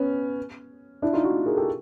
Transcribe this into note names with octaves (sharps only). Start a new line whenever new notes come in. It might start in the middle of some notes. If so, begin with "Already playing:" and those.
Already playing: B3 C#4
D4 E4
D#4 F4
E4 F#4
G#4 A#4
G4 A4